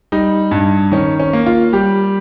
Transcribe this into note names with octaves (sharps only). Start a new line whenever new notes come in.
G3 D#4
G2
D#3 C#4
C#4
A#3
F4
G3 G4